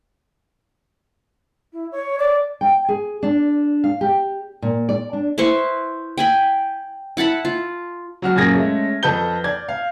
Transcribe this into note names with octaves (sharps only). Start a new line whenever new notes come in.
E4
C#5
D5
G5
G#4
D4
F5
G4
A#2
D5
D4
E4 B4 C5 C#6
G5 G#5 B5
E4 F#5 A5 B5
F4
F#3 F#4 F6
F#2 A#2 G#4 G#6 A#6
G#3 A3 C#4
F2 A4 B4 G6 G7
D5 G#6
F5